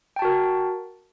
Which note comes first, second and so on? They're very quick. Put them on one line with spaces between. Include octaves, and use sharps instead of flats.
G5 A5 F#4 A#4